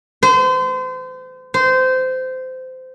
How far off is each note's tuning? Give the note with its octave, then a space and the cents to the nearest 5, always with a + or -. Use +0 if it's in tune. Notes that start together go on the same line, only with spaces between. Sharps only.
C5 -35
C5 -20